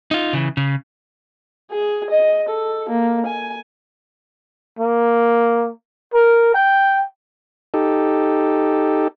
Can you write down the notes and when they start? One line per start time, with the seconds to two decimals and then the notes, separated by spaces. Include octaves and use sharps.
0.11 D#4 F4
0.33 C#3 E3
0.57 C#3
1.72 G#4
2.11 D#5
2.49 A4
2.90 A#3
3.27 G#5
4.79 A#3
6.14 A#4
6.54 G5
7.74 D#4 G4 A4